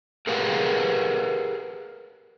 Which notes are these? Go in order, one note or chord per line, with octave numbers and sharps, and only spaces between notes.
G4 G#4 A#4 B4 F5 F#5